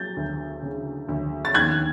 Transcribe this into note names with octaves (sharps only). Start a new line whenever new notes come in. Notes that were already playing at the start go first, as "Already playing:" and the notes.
Already playing: F#3 G6 A6
D2
C#3
D2
A6
D#2 F#6 G#6